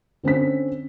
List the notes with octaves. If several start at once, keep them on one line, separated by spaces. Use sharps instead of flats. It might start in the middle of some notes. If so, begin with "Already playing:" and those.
D3 C4 C#4 B6